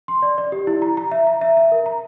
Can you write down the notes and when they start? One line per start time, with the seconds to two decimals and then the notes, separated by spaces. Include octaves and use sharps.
0.08 C6
0.22 D5
0.38 D5
0.52 G4
0.67 E4
0.82 A#5
0.97 A#5
1.11 E5
1.27 A#5
1.41 E5
1.57 E5
1.72 A#4
1.86 A#5